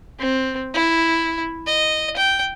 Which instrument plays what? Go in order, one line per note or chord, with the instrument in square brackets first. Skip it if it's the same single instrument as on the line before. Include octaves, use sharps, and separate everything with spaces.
[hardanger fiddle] C4
E4
D#5
G5